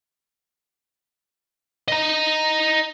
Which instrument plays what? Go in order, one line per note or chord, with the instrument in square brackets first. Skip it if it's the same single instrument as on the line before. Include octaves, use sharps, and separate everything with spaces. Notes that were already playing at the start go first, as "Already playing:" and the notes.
[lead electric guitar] D#5 A#5